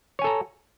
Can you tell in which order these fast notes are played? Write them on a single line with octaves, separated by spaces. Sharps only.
C#5 G#5 A4 A#5